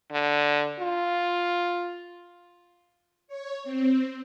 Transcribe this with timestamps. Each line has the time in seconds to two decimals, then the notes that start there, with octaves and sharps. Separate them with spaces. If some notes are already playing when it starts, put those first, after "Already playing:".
0.12 D3
0.79 F4
3.28 C#5
3.64 C4